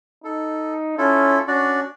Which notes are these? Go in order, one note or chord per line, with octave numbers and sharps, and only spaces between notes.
D#4 A4
C#4 E4 F4 A4
C#4 D4 F#4 D5